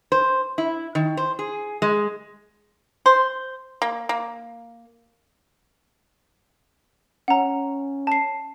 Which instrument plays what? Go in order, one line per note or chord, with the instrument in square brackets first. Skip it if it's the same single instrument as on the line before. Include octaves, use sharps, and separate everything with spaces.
[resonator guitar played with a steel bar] C5
E4
D#3
C5
G#4
G#3
[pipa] C5
A#3
A#3
[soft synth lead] C#4 [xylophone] F#5 A#5
[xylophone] A5 C7